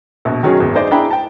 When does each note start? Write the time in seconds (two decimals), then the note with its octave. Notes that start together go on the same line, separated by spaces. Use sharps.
0.25 A#1 B2
0.43 D#3 F#3 C#4 G#4
0.60 G#1 E2
0.75 D#4 G#4 C5 D5 D#5
0.91 D4 E4 G#4 G5 A#5 B5
1.11 G5 A5